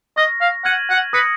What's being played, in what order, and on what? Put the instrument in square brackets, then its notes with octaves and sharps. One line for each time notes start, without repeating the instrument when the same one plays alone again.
[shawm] D#5 [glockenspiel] C#6 F6 A#6
[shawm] F5
[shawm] F#5 [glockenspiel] F6 G#6 D#7 F#7
[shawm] F#5
[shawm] B4 [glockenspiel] D#6 A#6 C#7